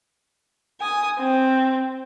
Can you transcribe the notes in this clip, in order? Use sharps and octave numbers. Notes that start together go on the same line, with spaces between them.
G#5 D#6
C4